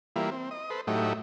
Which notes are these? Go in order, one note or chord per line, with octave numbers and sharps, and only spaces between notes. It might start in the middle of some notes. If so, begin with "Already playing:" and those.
E3 G3 A#3 E4 F4
C4
D#5
A4 B4 C5
A2 F#3 A3 D#4 E4 G4